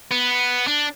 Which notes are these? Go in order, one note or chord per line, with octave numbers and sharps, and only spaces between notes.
B3
D4